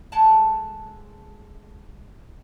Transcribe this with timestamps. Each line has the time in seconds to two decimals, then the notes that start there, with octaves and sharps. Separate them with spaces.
0.12 G#3 A4 F#5 A5